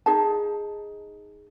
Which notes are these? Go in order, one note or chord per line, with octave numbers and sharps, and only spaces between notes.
D#4 G#4 A5